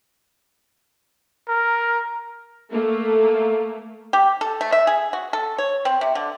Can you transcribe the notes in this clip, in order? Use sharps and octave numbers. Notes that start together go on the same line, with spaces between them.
A#4
A3 A#3
G4
A4
A3
E5
G#4
F#4
A4
C#5
C4
C3
D3